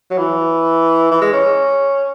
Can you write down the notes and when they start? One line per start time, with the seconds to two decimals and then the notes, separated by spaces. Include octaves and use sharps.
0.10 F#3
0.18 E3
1.11 E3
1.21 G#3
1.33 C#4